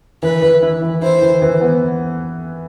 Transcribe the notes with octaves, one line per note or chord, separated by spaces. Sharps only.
E3 B4
E3
E4
E3
E4 C5
E3
E3
B3